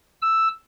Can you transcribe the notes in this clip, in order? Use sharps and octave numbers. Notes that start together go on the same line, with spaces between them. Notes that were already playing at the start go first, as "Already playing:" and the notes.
E6